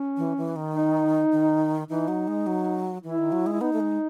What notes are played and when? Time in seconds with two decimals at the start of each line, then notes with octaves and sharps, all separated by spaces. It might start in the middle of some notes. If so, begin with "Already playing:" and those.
Already playing: C#4
0.17 E3
0.37 E3
0.56 D#3
0.75 D#4
1.32 D#3
1.89 E3 D#4
2.08 F#3
2.28 G#3
2.47 F#3
3.03 E3 E4
3.18 D#3
3.32 F#3
3.47 G#3
3.53 E4
3.61 B3 D#4
3.73 A3
3.80 G#3